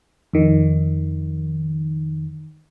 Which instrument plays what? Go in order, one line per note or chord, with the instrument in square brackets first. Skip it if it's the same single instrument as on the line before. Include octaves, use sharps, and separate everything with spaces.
[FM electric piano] F2 D#3